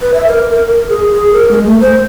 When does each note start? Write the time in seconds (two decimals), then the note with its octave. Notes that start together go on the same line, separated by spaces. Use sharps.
0.02 B4
0.14 E5
0.27 A#4
0.51 A#4
0.68 A#4
0.89 G#4
1.12 G#4
1.33 A#4
1.51 G#3
1.65 A3
1.81 C5